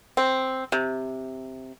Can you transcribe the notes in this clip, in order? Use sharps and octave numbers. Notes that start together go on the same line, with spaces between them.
C4
C3